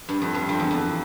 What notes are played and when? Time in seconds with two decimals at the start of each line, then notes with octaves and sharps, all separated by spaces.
0.09 G2
0.22 F2
0.34 G2
0.49 F2
0.60 E2
0.71 F2